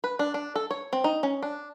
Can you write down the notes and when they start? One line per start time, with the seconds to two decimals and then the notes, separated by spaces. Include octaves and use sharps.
0.04 B4
0.19 D4
0.34 D4
0.56 A4
0.71 C#5
0.93 C4
1.04 D#4
1.23 C#4
1.43 D4